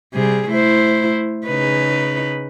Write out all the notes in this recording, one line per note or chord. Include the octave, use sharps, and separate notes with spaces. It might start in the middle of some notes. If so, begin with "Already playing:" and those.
C3 G3 G#4
A3 E4 C5
C#3 D#4 B4